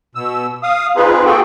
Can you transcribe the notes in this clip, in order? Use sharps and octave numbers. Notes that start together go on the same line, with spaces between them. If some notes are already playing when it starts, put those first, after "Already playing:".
B2 E6
F5 D#6
C4 D#4 F4 G#4 B4
A#3 F#4 G#4 A4 G5